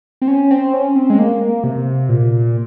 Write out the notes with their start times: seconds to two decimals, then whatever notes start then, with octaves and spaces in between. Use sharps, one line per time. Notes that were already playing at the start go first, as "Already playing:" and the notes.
0.22 C4
0.28 C#4
0.51 C4
0.73 C#4
0.96 C4
1.10 G#3
1.19 A#3
1.64 C3
2.09 A#2